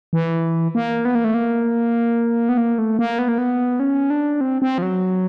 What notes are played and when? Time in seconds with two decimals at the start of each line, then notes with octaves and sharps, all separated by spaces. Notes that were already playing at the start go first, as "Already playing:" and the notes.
0.13 E3
0.75 A#3
1.05 B3
1.15 A#3
1.24 A3
1.34 A#3
2.49 B3
2.57 A#3
2.78 A3
2.99 A#3
3.19 B3
3.29 A#3
3.38 B3
3.80 C#4
4.10 D4
4.41 C4
4.62 C4
4.78 F3
4.82 F#3